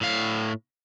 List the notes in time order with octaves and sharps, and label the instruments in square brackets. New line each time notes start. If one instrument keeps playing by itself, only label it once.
[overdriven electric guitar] A2 F5